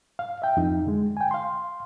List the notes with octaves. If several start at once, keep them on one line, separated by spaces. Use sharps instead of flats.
F5
E5 G5
F2 D#4
D3 G#3
G5 G#5
F5 C6